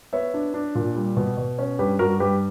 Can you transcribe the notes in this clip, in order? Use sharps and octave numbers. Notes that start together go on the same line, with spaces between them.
B3 C#5 E5
D4
D4
A#2
G3
B2
B2
C#4
G2 G4 B4
G2 F#4 A#4
G2 G4 B4